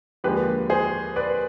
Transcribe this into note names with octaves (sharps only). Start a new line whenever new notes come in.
D#2 D3 F3 G#3 G4 B4
G#4 C5
B4 D5